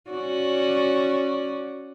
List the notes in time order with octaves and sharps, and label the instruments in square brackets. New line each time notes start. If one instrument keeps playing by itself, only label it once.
[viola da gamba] C#4 F#4 D5